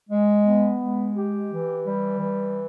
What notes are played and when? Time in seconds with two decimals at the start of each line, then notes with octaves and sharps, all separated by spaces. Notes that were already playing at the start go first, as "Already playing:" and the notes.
0.09 G#3
0.45 B3
0.80 G#3
1.15 G4
1.50 E3
1.85 G3
2.20 E3